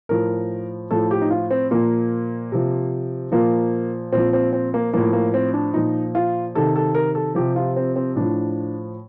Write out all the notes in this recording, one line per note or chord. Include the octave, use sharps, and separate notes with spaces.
A2 F3 A#4
A2 F3 A4
G4
D#4
F4
C4
A#2 F3 A#3
C3 F3
A#2 F3 A#3
A#2 F3 C4
C4
C4
A#3
A2 F3 A#3
A#3
C4
D4
A#2 F3 D#4
F4
C3 D#3 A4
A4
A#4
A4
C3 F3 G4
F4
C4
C4
A2 F3 D4